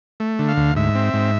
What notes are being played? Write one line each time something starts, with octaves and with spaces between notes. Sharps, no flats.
A3
D3
F5
D2
G#2 E5
C4
G#2